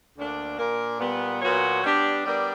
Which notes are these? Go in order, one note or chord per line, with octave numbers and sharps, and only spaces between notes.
D2 D3 A#3 D4
A#2 A#3 D4 A#4
A#2 G3 B3
A#2 F#3 B3 F#4 C#5
G3 B3 D4 G4
G3 B3 D4 A#4 D5